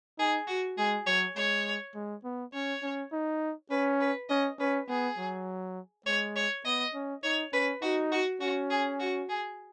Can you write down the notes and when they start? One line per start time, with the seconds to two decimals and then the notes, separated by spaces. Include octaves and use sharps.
0.18 D#4 G#4
0.48 F#4
0.78 G#3 G#4
1.06 F#3 C#5
1.36 G#3 C#5
1.95 G#3
2.24 B3
2.54 C#4 C#5
2.83 C#4
3.12 D#4
3.71 C#4 B4
4.00 B4
4.29 C#4 D#5
4.59 C#4 B4
4.88 B3 G#4
5.18 F#3
6.06 G#3 C#5
6.36 C#5
6.65 B3 D#5
6.94 C#4
7.23 D#4 C#5
7.53 C#4 B4
7.82 D#4 F#4
8.12 F#4
8.41 C#4 F#4
8.70 G#4
9.00 F#4
9.29 G#4